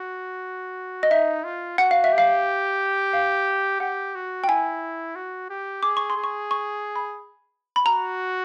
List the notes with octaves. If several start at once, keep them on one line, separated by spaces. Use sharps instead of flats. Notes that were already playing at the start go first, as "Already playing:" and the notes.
Already playing: F#4
D#5
D#4 E5
F4
F#4 F#5
F5
E5
G4
F5
F5
G4 F#5
F#4
G5
E4 G#5
F#4
G4
G#4 D6
C#6
C6
G#4
C#6
C#6
B5
B5
F#4 A#5